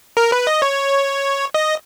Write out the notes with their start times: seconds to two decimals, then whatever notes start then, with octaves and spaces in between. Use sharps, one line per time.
0.17 A#4
0.32 B4
0.47 D#5
0.62 C#5
1.54 D#5